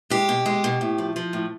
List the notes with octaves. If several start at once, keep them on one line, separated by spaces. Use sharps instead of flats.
G#3 G4
B2
G#3
B2
A2
F3
F3
A2